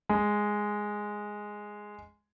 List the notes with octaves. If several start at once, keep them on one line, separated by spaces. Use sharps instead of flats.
G#3